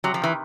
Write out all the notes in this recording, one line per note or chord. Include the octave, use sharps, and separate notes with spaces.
C3 F#3
F3
D#3 E3